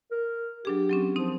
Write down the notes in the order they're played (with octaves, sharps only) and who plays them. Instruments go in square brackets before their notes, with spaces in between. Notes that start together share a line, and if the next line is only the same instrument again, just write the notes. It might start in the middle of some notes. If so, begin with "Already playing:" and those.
[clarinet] A#4
[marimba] F#3 D4 G#4 [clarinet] G4
[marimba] F#3 C4 C#4
[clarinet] F3 [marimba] C4 D#4